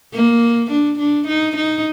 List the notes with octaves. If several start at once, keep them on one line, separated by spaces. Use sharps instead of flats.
A#3
D4
D4
D#4
D#4